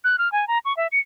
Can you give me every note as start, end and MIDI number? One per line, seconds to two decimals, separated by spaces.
0.04 0.16 90
0.18 0.31 89
0.32 0.47 80
0.48 0.58 82
0.65 0.76 85
0.77 0.87 76
0.92 0.99 97